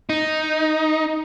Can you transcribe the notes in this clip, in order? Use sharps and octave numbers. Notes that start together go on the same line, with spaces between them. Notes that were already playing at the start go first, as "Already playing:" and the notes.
D#4